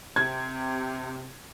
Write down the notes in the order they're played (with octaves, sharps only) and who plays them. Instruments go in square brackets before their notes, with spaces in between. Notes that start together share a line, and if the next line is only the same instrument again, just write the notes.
[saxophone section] C3 [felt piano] G#6